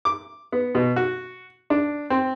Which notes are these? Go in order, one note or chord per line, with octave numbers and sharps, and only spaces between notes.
D6
B3
B2
F#4
D4
C4